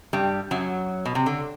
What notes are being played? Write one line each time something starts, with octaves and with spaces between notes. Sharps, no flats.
G2 G3
F#2 F#3
B2
C3
D3